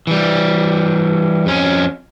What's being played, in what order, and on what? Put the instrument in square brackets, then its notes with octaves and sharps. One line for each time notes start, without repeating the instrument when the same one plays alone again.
[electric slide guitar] E3 G3
F2 C#4